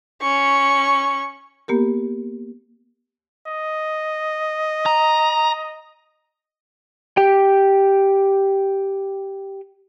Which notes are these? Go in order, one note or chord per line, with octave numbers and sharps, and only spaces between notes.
C#4 C#6
A#3 B3 G4 A#4
D#5
A#5
G4 G5